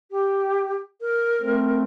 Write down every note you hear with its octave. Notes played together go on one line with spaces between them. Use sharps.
G4
A#4
A3 C4